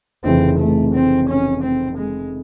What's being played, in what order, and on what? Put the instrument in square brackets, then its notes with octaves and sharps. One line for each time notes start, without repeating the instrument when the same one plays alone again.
[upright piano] F1 F2 C#3 E3 [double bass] C4
[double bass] A3
C4
C#4
C4
G#3